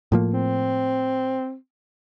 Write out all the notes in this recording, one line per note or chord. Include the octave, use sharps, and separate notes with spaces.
A2 F3 A#3
C4